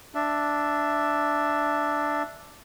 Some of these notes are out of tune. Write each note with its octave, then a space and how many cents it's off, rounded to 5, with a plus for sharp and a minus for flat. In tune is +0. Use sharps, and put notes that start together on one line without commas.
D4 +0 E5 +5